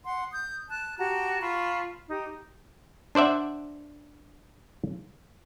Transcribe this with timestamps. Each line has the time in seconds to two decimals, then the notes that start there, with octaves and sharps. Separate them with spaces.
0.04 F#5 C6
0.33 D#6 G6
0.70 A5 F#6
0.98 F#4 G4 A5 A#5
1.41 F4 A5 B5 C#6
2.08 D#4 G4
3.15 D4 C5 D5 E5 F#5